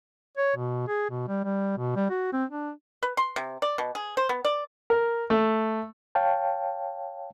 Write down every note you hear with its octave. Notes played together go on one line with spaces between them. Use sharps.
C#5
B2
G#4
B2
G3
G3
B2
G3
F#4
C4
D4
B4
C6
C3
D5
B2
G#4
C5
B3
D5
A#4
A3
C#5 F5 G5 A5